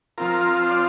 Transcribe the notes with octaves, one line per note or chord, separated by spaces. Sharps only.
F3 C4 F4 A#4
C5
D5